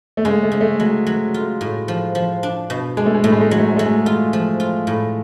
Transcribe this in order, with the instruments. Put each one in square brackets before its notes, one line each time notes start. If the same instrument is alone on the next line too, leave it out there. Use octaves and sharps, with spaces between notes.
[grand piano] A3
[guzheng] C#3 [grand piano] G#3
[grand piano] A3
[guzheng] C#3
[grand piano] A3
[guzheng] F#3 [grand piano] G#3
[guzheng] F#3
F4
A2
F3
F3
D4
B2
[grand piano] G#3 [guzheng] D4
[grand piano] A3
G#3
[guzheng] A2 [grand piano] A3
[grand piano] G#3
A3
[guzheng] F#3 [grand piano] G#3
[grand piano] A3
G#3
[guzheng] F#3 [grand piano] A3
[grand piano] G#3
[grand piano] G#3 [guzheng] F4
[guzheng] F3
F4
A2